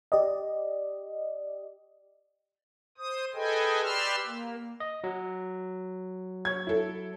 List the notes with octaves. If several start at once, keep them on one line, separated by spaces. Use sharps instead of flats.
G4 D5 D#5
C5 D#6
G#4 A4 B4 D#5 G5 G#5
G4 B4 D5 C6 E6 F6
A#3
D#5
F#3
C#5 G#6
E4 A4